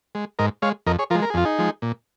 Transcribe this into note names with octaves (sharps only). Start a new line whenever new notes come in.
G#3
G#2 A#4 D#5
G#3 C#5 F5
F2 A#4 D#5
G#4 C#5
F3 G#3 F4 A#4
A#4
G#4
F2 F4
D#4 G#4
F3 G#3
A#2